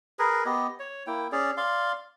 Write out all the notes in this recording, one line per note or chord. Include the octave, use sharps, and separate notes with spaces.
G#4 A#4 B4
B3 G4 D#5
C#5
A#3 E4 G5
C#4 G#4 D5
D5 F5 C6